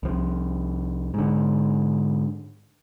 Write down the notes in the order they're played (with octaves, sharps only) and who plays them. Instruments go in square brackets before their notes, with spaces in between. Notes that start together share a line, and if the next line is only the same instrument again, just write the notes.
[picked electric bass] C2 F3
G#2 D3